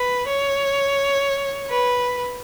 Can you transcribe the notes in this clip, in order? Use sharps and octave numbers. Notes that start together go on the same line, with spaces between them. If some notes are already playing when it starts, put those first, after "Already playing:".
Already playing: B4
C#5
B4